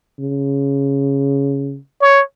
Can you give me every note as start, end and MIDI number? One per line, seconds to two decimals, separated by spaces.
0.19 1.77 49
2.01 2.22 73